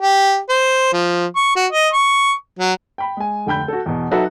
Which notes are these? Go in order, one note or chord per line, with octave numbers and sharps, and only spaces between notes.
G4
C5
F3
C#6
F#4
D#5
C#6
F#3
G5 B5
G#3 G#5
F1 D3 G5 B5 G6
F#4 A4
E2 B2
F#3 D#4 F#4 A4 B4 E5